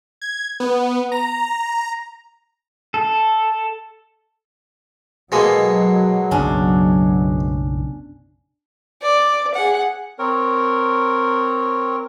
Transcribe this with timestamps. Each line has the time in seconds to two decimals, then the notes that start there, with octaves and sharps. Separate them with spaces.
0.22 G#6
0.60 B3
1.12 A#5
2.94 A4
5.32 B2 F#3 G#3 A#3 G#4 A4 D#5
6.31 F#1 B1 C#4 D4
9.02 D5
9.54 G#4 F#5
10.19 C4 A#4 C#5